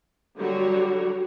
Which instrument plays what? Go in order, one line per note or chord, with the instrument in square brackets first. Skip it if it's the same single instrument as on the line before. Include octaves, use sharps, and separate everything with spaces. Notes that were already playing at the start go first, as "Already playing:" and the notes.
[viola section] D3 F#3 G3 F#4 C#5